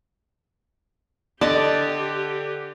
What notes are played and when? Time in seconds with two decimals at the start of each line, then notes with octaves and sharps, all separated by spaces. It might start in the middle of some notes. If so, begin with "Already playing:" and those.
1.41 D3 G4 D5 D#5 A5